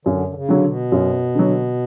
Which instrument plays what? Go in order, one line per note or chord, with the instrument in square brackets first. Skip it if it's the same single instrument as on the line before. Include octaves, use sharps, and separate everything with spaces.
[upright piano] F#2 [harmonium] D3
[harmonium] D3
C#3
[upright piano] D3 F#3
[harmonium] B2
[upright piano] F#2
D3 F#3